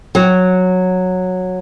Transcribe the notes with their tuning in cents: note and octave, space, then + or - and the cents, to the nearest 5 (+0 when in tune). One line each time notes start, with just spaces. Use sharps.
F#3 -10